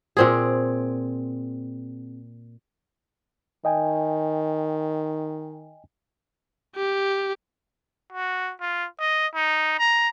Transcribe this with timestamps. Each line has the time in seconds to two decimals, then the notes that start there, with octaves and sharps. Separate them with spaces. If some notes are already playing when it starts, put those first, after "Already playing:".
0.17 A#2 C4 G#4
3.65 D#3 D#5 G5 G#5
6.76 G4
8.12 F#4
8.60 F4
8.99 D#5
9.35 D#4
9.79 A#5